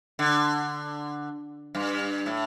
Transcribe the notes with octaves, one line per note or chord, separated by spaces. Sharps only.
D3
G2
A2